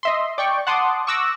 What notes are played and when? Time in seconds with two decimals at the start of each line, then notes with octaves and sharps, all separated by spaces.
0.03 D#5 E5 C6
0.38 D5 G5 C#6
0.67 F#5 A5 C6 D6 D#6
1.07 C#6 D6 E6 F#6 A#6